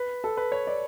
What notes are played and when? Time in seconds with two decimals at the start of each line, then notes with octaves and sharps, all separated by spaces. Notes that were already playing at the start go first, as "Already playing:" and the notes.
Already playing: B4
0.24 A4
0.37 B4
0.52 C#5
0.67 D5